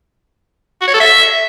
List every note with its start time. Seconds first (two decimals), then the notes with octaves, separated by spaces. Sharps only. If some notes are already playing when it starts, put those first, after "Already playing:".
0.81 F#4
0.88 C#5
0.94 A4
1.00 E5